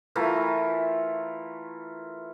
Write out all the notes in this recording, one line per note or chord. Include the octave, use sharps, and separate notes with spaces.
E3 A3 F4 A#4